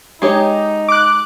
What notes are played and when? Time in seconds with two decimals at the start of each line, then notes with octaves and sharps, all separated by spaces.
0.22 G#3 D#4 G4 C#5
0.88 D6 F#6